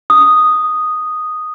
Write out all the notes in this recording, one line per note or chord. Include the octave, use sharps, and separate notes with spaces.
D#6